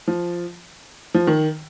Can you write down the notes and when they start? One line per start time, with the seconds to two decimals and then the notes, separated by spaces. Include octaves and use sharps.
0.08 F3
1.14 F3
1.27 D#3